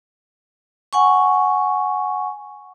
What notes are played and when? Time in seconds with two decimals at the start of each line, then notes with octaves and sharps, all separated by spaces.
0.93 F#5 G#5 C#6